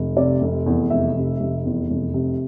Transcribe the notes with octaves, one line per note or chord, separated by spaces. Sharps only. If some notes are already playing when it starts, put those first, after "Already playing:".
Already playing: F1
C3 D5
F1
E2
F1 E5
C3
F1
E2
F1
C3